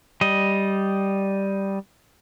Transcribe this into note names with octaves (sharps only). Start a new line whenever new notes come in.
G3 D#5